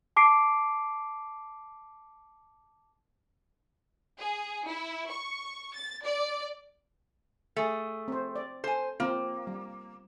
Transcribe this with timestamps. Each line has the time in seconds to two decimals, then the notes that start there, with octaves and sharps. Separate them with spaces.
0.16 A5 D6 C7 D7
4.19 G#4
4.67 E4
5.10 C#6
5.75 A6
6.05 D5
7.56 A3 G#4
8.08 C4 C5
8.36 D5
8.64 A4 C5 G#5
9.00 A#3 C4 F4
9.47 G3